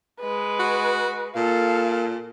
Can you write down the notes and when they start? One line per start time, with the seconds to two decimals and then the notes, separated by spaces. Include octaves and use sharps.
0.20 G#3 B4
0.60 F#4
1.36 A#2 A4 F5